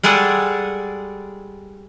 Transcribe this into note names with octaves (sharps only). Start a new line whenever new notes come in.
G3 G#3 G#4 A4 D5 F#5